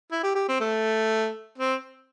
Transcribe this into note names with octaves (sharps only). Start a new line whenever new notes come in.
E4
G4
G4
C4
A3
C4